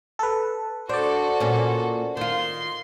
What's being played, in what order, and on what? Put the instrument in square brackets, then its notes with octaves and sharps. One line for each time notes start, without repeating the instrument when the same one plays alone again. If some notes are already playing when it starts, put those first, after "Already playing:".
[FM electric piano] A4 B4
[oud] D4 [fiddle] F#4 A4 [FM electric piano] C5 D5
[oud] A#2 C#4
[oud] D#3 F4 [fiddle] C6